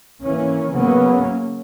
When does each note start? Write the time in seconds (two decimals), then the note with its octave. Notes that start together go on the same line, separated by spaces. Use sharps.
0.21 E3 A#3 C#4
0.72 C#3 F#3 A#3 B3 C#4